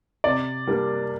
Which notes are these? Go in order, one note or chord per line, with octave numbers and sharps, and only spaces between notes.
C3 D5
G3 A#3 D4